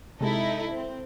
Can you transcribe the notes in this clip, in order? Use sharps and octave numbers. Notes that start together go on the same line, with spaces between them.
C3 G#3 D#4 E4 A4
C4